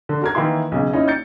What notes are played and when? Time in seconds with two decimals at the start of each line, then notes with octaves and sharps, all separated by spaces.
0.09 D3
0.22 F#4 A#4 G#6
0.35 D#3 E3 A#3 E4 C6
0.72 B1 C#3
0.93 A#3 C#4 D#4 E4
1.08 G6 A6 C#7